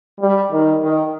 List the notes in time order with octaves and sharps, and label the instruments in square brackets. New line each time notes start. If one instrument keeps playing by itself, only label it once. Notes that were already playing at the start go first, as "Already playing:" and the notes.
[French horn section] G3
D#3
D#3